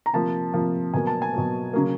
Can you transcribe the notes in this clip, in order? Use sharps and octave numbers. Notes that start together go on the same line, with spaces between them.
A#5
C3 F3 A#3 A5
C3 F3 A#3
B2 F#3 A#3 G#5
A5
G#5
B2 F#3 A#3
C#3 F#3 A#3